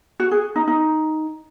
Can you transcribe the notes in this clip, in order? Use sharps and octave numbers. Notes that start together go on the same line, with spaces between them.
F#4
G#4
D#4
D#4